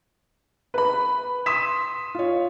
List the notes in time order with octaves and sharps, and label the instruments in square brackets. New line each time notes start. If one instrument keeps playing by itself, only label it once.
[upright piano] B4 B5
[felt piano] C6 D#6 B6 [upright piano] E7
[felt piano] F4 C#5